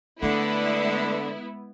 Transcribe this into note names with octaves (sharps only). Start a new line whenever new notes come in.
D3 G#3 A3 B3 E4